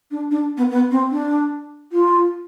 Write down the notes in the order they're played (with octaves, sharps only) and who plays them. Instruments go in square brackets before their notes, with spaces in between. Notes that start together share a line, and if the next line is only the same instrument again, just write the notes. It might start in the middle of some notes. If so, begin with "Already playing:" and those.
[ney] D4
D4
B3
B3
C4
D4
F4